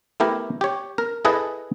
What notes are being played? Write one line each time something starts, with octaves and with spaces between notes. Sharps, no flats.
A3 B3 E4 G4 A#4
G4 C#5
A#4
E4 G#4 A4 B4 D#5 E5